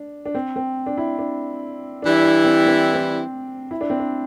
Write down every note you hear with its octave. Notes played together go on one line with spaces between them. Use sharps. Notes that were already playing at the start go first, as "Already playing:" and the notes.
Already playing: D4
D4
C4
C4
D4
E4
D4
E3 G3 D4 E4
D4
C4
C4
C4
E4
D4
C4
D4